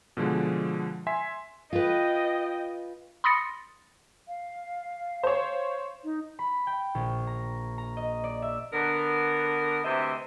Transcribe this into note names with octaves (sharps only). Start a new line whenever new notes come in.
B2 D3 F3 G#3
E5 G#5 C6 B6
F4 B4 D#5 G5
B5 C6 D#6 A6 A#6 C#7
F5
C5 C#5
D#4
B5
G5
A#1
A#5
A#5
D#5
D5
E5
D3 B3 A#4
D2 C3 E3 C5 D#5 E5